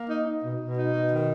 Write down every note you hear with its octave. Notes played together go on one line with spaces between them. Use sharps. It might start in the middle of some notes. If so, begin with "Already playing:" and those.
Already playing: A#3
D#4
D#4
B2
B2
D#4
B2
D#3